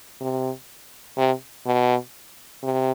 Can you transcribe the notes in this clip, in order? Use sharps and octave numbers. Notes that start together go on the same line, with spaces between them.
C3
C3
B2
C3